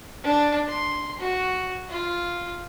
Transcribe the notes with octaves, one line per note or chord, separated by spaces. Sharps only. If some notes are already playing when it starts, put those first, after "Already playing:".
D4
C6
F#4
F4